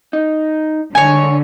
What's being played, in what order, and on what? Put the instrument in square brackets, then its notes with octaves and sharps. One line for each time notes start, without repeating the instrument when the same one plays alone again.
[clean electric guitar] D#4
[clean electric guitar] G2 G#3 [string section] D3 [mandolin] C#5 G#5